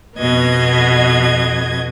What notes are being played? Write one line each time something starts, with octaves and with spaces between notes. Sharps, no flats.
F2 B2 B3 D#5 G#6